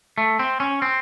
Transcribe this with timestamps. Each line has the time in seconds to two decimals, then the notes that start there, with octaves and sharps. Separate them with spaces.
0.18 A3
0.39 C4
0.60 C#4
0.82 C4